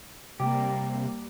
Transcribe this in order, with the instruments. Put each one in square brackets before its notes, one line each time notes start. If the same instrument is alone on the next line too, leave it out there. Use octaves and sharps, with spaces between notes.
[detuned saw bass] C3 [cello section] G3 A#3 [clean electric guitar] G4